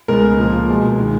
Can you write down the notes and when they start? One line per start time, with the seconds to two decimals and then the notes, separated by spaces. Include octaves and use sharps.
0.08 C#2 C#3 G#3 B3 A#4
0.38 A#2 F3 A#3
0.68 C#2 B2 G#3
0.98 D#3 G#3